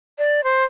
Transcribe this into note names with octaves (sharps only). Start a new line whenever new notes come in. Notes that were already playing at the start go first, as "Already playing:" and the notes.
D5
C5